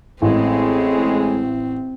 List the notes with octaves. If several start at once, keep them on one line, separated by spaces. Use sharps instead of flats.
A1 A2 G#3 C4